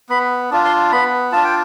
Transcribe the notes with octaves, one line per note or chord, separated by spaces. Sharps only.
B3 B5
D4 F4
C6
B3 B5
D4 F4 A5
G5